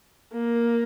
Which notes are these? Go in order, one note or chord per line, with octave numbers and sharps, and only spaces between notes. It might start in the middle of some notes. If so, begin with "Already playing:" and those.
A#3